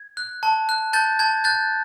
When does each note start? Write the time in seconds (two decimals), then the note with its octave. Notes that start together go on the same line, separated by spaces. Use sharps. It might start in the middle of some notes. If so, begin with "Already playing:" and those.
Already playing: G#6
0.17 F#6
0.43 A5
0.69 F#6
0.93 A5 G6 A6
1.19 A5 G#6
1.44 F#6 G6 A6